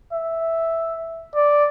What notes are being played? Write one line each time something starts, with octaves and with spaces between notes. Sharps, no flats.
E5
D5